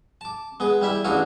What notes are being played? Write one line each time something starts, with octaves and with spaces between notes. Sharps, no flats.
A5 D6
G#3 B3 G#4
G3 E4 E5 G5
A1 D4 E4 F#4 G#4 F5